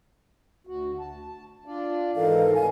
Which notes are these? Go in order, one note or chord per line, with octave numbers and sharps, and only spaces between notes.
D2 F#4
A5
D4 F4 D5
G#2 D#3 E3 A4 A#4 F5
A2 C3 G#5